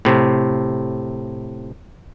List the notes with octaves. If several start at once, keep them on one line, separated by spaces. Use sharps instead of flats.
A2 C3